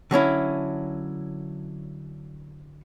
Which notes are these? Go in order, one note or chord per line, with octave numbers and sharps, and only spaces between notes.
D3 F#3 C#4 E4